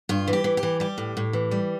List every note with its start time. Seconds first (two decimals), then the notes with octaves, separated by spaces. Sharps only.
0.09 G2 F4
0.28 E3
0.33 G4
0.44 E3
0.57 G4
0.63 E3
0.80 G3 G4
0.98 A2
1.17 A2
1.33 E3
1.51 G3